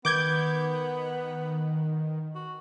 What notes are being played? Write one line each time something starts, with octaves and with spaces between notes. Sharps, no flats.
D#3 B3 D6 G6 G#6
F#4